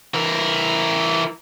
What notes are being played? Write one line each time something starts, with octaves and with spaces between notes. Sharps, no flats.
E3 A#4